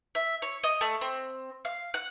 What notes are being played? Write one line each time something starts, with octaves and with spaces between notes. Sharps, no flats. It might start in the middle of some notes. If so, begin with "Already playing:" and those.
E5
C#5
D#5
A3
C4
F5
F#5